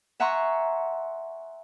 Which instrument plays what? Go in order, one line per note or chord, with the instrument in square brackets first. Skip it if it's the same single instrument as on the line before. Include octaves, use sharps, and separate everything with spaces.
[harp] E5 F#5 G#5 A#5 C6 C#6